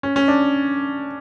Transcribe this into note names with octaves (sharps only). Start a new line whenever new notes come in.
C#4
C#4
D4